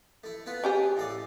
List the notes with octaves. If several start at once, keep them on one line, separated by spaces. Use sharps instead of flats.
A3 E4
B3 F4 B4
C#4 G4 G#4
A2 A4 D5